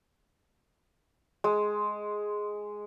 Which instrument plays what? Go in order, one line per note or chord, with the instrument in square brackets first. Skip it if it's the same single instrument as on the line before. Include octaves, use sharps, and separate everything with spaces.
[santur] G#3